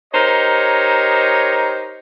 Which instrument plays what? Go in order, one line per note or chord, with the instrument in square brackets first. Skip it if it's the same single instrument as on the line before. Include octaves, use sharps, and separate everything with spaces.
[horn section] D#4 G4 A#4 C5 C#5 D#5